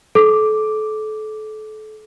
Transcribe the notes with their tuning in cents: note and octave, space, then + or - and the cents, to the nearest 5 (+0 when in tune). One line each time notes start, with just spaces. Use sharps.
A4 -30 D6 +0